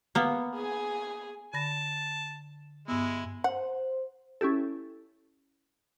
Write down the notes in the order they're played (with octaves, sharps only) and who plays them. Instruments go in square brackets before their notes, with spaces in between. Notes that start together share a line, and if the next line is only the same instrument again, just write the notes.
[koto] A#3 B3
[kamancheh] G#4 G#5
[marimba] D3 B5 A#6 [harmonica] A5
[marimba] G2 B3 [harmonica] G#3 E4
[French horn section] C5 [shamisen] F#5
[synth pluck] C#4 E4 G4 A4